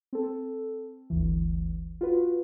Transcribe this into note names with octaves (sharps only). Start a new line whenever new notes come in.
C4 A4
G1 D2 E3
F4 F#4 B4